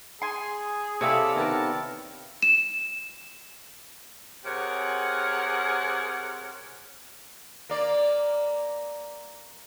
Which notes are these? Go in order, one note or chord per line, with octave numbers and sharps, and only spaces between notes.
G#4 G#5 C6
C3 E4 A4 C#5 D5 F5 E6
D#3 B3 A#4 A5
E7
C3 G#4 A#4 C#5 F#5
A#3 D5